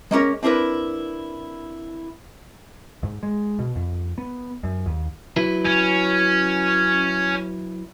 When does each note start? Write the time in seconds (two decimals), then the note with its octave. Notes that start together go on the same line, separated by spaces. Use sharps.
0.11 G#3 A#3 C#4 A#4
0.43 C4 D4 E4 A#4 B4
3.03 G#2
3.23 G#3
3.59 B2
3.75 F2
4.18 B3
4.63 F#2
4.86 D#2
5.36 F#3 E4 B4
5.66 C#4